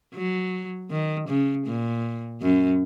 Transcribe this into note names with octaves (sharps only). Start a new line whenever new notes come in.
F#3
D#3
C#3
A#2
F#2